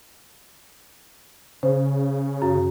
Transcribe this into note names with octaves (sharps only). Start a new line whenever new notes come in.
C#3 C5
F#2